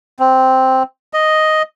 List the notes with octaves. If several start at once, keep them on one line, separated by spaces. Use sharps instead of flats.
C4
D#5